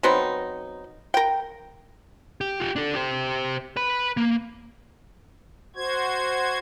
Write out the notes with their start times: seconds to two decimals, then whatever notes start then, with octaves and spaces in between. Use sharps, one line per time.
0.03 F#3 B3 C4 D#4
1.14 A#4 G5
2.41 G4
2.60 F4 G4
2.76 D4 A4
2.95 G4 C5
3.77 B4 B5
4.17 A#3
5.76 F#4 C5 G#6